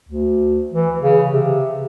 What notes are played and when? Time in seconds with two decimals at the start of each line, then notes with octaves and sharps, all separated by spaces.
0.09 D2
0.73 E3
1.01 C#3
1.30 C3